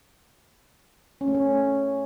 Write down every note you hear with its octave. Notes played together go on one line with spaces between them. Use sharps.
C#4
A3
C#4